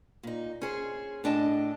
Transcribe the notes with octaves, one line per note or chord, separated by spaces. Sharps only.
A#2 D#4
C#4 G#4 C5
A2 D4 D#5 A5